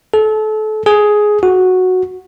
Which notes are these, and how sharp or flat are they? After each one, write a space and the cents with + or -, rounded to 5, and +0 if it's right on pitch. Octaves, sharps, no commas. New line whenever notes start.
A4 -30
G#4 +10
F#4 -5